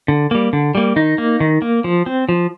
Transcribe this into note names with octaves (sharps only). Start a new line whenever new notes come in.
D3
G3 A#3
D3
G3 A#3
D#3 D#4
A#3
D#3
A#3
F3
C4
F3